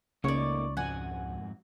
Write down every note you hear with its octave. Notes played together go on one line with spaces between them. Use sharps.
C#2 A3 A#3 D#4 C#5 D5
F2 G#2 F#4 F#5 G#5